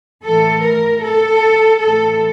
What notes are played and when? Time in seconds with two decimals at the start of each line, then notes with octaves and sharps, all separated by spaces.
0.23 A2 E3 A4
0.62 A#4
1.03 A4
1.81 A2 E3 A4